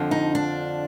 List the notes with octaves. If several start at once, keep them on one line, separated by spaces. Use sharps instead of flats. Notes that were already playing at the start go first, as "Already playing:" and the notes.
Already playing: F2 D3 F3
D#4
D4